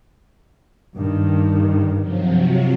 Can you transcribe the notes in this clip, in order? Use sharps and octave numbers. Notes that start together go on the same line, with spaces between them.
G2 D#3
C3 F3 F#3